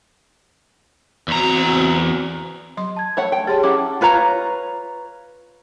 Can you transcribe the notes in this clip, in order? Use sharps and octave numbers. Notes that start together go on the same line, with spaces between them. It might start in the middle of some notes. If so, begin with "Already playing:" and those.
E2 C4 F#4 A#5
F#3 C6
A5 G#6
A3 C#5 F#5
G5
G4 G#4 C#5 A5 C6 A6
F#3 C#4 E4 F#5 G5 D6
F4 B4 C#5 A#5